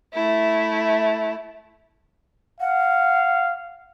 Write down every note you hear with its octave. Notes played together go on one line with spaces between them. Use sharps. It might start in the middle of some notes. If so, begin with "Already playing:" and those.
A3 E4
F5 F#5